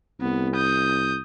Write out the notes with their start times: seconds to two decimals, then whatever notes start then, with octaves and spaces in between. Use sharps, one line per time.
0.21 C2 B3
0.55 D#6 G6